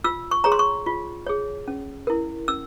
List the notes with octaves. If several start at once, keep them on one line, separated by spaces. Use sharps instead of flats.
F4 E6
C#6
G#4 C#5 A#5
C6
C#6
F4
G#4 C#5
C#4
E4 A#4
C#4 E6